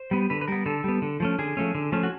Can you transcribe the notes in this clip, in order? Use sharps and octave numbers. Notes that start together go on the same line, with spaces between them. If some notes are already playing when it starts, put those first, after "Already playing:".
Already playing: C5
G3 B3
D3 B4
B4
G3 B3 A#4
D3 A4
G3 B3
D3
F3 A3 C#4
D3 G#4
F3 A3 C#4
D3
F3 A3 C#4
F#4